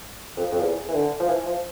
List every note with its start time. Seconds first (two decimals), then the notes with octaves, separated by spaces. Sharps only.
0.37 F2
0.51 F2
0.60 E2
0.88 E3
0.94 D3
1.20 F3
1.28 E3
1.46 F3